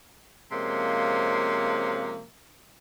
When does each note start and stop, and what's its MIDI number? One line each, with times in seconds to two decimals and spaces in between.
0.52 2.23 48
0.52 2.23 53
0.52 2.23 56
0.52 2.23 58
0.52 2.23 61